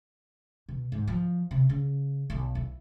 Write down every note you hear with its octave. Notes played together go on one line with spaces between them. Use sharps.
B2
G#2
F3
C3
C#3
B1
E4